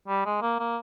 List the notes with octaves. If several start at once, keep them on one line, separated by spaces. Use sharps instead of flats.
G3
G#3
A#3
A#3